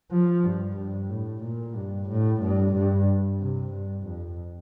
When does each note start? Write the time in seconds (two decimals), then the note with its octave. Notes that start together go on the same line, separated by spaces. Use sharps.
0.12 F3
0.44 G2
0.77 G2
1.10 A2
1.43 A#2
1.76 G2
2.09 A2
2.42 G2
2.75 G2
3.40 C3
3.73 G2
4.06 F2